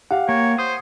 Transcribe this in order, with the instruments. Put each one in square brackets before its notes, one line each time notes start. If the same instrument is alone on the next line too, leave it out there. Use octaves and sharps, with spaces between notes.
[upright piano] G4 F5 [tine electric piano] F#5
[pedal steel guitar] A#3 [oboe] C#5
[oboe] C5 [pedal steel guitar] D#6